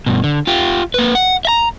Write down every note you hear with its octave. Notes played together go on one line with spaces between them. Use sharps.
G2 B2
D3
F4 G4
A#3 B4
F#5
E5 A#5